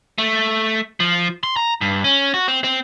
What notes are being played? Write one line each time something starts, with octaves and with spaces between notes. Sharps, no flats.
A3
F3
C6
A#5
G2
C#4
F#4
C4
C4